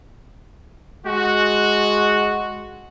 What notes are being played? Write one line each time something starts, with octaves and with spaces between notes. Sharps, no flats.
G#3 F#4